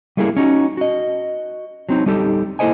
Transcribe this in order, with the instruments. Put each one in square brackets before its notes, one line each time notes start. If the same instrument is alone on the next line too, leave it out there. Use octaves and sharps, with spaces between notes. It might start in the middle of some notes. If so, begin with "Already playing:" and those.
[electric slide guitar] G3 A3 A#3 E4 G#4 A#4
C#4 D#4 F#4
F#4 D#5
F#3 C4 D#4
G3 D#4 G4 A4
A#3 E4 A4 C5 D#5 G#5